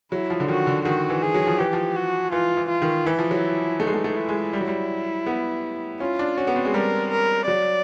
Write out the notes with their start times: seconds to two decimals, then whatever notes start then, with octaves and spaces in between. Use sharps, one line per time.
0.12 F#3 E4
0.30 F3
0.40 D3
0.48 D#3 F#4
0.67 D3
0.85 D#3 F#4
1.10 E3
1.23 G#4
1.34 F#3
1.47 F3
1.59 E3 G4
1.73 F3
1.96 F#4
2.32 E3 F4
2.57 E3
2.69 F4
2.82 D#3
3.06 E3 E4
3.19 F3
3.31 F#3
3.80 A3 D#4
3.87 G#3
3.94 A3
4.04 A3
4.17 E4
4.29 G#3
4.53 G3
4.61 F#3
4.68 G3
5.26 B3
6.00 C#4 F4
6.19 D4
6.38 C#4 F#4
6.47 B3
6.56 C4
6.65 G#3
6.74 G3 A#4
7.11 A#4
7.47 F#3 D5